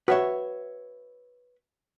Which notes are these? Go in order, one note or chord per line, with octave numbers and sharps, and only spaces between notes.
F#4 B4 C#5 E5